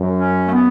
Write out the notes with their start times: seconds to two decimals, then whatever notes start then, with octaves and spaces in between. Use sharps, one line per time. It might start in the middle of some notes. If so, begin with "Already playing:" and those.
Already playing: F#2
0.11 C#4
0.47 A3
0.52 B3